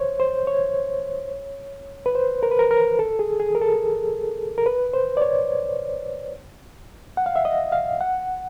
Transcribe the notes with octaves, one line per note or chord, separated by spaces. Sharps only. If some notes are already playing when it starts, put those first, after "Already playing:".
Already playing: C5 C#5
C5
C#5
B4
C5
A#4
B4
A#4
A#4
A4
G#4
G#4
A#4
A4
A#4
B4
C5
D5
C#5
F#5
F5
E5
D#5
F5
F#5